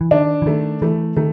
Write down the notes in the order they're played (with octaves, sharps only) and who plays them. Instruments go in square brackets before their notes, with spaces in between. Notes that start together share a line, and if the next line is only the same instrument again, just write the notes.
[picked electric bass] E3
[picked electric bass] D#3 [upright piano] D4
[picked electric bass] E3
[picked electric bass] D#3 [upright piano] A3
[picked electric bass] E3 [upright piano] A3
[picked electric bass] D#3 [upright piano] A3